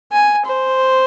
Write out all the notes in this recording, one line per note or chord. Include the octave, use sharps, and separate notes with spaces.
G#5
C5